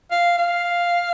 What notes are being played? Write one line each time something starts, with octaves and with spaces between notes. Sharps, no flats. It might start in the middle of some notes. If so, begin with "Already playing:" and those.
F5
F5